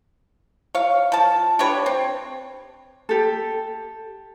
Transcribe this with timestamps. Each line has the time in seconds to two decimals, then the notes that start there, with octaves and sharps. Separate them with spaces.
0.75 C#5 F5
1.12 F3 A5
1.59 D4 G4 B4 C#5
1.86 C4
3.09 G4 A4